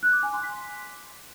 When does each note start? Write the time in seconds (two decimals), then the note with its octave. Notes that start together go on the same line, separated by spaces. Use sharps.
0.03 F#6
0.13 D6
0.23 G#5
0.33 C6
0.43 B6